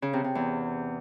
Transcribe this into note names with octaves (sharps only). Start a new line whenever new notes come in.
C#3
C3
C3
E2